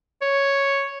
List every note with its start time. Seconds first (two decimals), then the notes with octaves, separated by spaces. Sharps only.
0.22 C#5